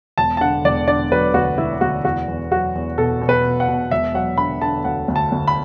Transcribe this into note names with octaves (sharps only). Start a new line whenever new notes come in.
E1 A5
A5
D3 F#5
E1 D5
D3 D5
F#3 B4
D2 F#4
E1 E4
D2 F#4
E2 F#4
E2
F#3 F#4
E2
B2 A4
B2
B4
B2
F#5
B2
E1 E5
F#3 F#5
D3 B5
D3 A5
D2 F#5
D2
A5
D2
B5